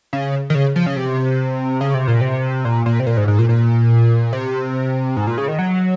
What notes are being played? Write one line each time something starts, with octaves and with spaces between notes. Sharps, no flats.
C#3
D#3
C#3
F3
C#3
C3
C#3
C3
A#2
C3
A#2
A#2
C3
A#2
G#2
G#2
A#2
A#2
C3
G#2
A#2
C#3
D#3
F#3